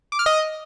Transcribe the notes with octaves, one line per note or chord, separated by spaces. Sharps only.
D6
F6
D#5